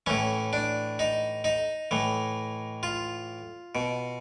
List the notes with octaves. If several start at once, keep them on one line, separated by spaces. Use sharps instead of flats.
A2 E3 C#4
D4
D#4
D#4
A2 E3
F4
B2